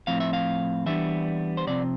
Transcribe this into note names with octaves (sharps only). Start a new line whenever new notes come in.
A2 F3 C4 F5
E5
F5
E3 G3 B3 D4 E5
C5
C3 F3 C4 D5